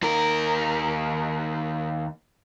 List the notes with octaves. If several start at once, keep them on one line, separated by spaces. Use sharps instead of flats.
D#2 A#4